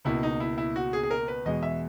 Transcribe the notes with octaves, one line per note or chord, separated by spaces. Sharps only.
C#2 B2 A#3 E4
D#4
E4
E4
F#4
G#4
G#4
A#4
B4
E2 B2 G#3 D#5
E5